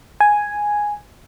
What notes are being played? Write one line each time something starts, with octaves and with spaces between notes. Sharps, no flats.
G#5